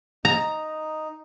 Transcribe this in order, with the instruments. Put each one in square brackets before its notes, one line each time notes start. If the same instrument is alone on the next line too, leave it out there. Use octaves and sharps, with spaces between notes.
[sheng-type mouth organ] D#4 [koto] A#5